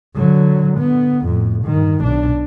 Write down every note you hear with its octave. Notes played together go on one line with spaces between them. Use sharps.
D3 F#3
D3 B3
F2 A2
G2 D#3
B1 D4